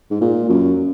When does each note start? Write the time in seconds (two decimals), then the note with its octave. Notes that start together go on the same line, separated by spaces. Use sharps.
0.10 G#2
0.21 A#2
0.49 F#2